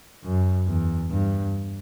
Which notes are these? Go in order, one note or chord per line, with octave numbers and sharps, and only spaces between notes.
F#2
E2
G2